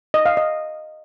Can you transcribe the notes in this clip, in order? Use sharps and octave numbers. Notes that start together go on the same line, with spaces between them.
D#5
F5
D#5